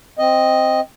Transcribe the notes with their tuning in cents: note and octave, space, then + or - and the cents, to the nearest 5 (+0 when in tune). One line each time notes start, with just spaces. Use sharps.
C4 +0 D#5 +0